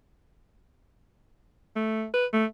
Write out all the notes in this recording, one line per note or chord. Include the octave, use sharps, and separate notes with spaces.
A3
B4
A3